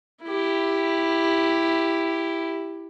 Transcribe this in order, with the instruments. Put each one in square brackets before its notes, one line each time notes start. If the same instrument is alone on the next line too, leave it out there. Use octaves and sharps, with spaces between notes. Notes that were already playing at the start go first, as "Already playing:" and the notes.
[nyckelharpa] E4 G4